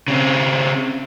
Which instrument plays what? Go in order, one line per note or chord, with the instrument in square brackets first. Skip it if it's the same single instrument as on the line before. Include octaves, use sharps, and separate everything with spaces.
[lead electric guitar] C#3 C4